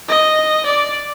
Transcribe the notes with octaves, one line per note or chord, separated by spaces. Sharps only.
D#5
D5